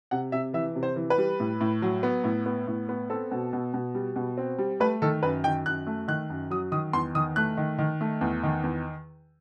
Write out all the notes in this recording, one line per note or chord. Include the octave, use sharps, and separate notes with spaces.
C3 F#5
C3 E5
E3 E5
C3
C5
E3
B4
G3
A2
A2
F#3
B3
A2
B3
A2
B3
C4 A4
B2
B2
B2
G3
B2
C4
G3
A3 B4
D#3 A4
F#2 B4
D#3 G5
F#2 F#6
A3
D#3 F#6
F#2
F#3 D#6
D#3 D#6
E2 C6
D#3 D#6
A3 F#6
D#3
D#3
A3
E2
D#3
E2